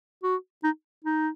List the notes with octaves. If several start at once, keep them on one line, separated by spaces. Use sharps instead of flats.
F#4
D#4
D#4